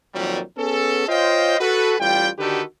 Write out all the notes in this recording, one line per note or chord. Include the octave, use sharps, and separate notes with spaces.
F2 A#2 D#3 F#3 G3
B3 C#4 G#4 A4
F4 C5 C#5 D#5 F5 G5
F#4 A4 B4
A1 G3 F4 G5
D3 D#3 F#4 G4 A4 B4